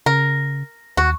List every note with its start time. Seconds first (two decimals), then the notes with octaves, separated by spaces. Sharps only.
0.06 C#3 A#4
0.97 D#2 F#4